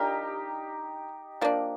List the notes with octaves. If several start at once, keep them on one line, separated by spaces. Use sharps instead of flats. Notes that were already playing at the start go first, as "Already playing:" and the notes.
Already playing: G3 D4 D#4 F4 G4 A#4
F3 A#3 D4